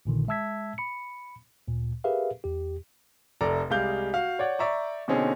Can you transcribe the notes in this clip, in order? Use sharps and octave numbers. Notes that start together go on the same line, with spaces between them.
A#1 A#2 D3 D#3
G#3 E5 A5 E6 G#6 B6
B5 C#7
D2 A#2
G4 G#4 A#4 B4 E5 F5
E2 G4
F1 A4 D5 A#5
C2 G3 G#3 F5 G6
F#4 F5
C#5 D5 F#5
D5 E5 A#5 C#6
B2 D3 C4 C#4 D#4 G#4